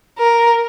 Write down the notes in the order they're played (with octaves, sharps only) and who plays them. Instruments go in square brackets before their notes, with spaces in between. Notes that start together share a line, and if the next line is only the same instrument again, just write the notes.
[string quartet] A#4